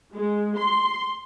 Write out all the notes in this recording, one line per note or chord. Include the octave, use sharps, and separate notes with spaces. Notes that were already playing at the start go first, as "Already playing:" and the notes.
G#3
C6